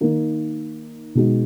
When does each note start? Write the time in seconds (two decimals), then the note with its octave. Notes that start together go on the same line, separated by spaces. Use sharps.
0.01 D#3 A#3 D#4
1.15 B2 G#3 D#4 F#4